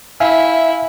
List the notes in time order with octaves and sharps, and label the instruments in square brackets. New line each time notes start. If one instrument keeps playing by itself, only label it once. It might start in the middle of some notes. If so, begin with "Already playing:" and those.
[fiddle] E4 [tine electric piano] E5 F5 G#5